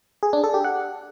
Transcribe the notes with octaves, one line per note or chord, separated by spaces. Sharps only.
G#4
D4
A4
G4
F#5